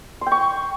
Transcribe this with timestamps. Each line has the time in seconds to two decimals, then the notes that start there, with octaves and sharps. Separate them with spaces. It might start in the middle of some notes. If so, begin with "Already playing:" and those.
0.21 C6
0.26 G5
0.31 C#6